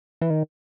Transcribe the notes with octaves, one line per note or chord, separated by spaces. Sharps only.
E3
D#3